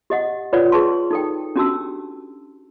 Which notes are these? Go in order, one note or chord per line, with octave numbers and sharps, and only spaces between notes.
G4 D#5 F#5
F4 B4 C#5 D5 F#5
G#4 B4 A5 C6
D#4 A4 G5
C#4 D4 F#4 G4 A5 E6